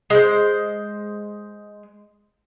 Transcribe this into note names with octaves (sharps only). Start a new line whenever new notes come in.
G#3 C5